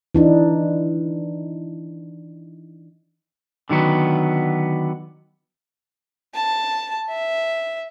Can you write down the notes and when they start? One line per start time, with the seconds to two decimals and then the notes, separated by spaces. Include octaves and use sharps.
0.15 E3 D4 D#4
3.69 D3 D#3 F#3 B3
6.35 A5
7.10 E5